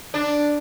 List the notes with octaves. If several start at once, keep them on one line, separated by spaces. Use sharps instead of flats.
D4